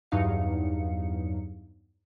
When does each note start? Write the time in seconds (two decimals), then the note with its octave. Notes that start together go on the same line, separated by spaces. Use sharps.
0.11 E2 G2 F#3 D#4 F5 C#7